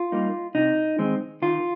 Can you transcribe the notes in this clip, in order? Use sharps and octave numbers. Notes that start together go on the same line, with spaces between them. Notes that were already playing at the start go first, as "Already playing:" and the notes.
Already playing: F4
G3 A#3 D#4
C3 D#4
D#3 G#3 C4 D#4
D#3 F4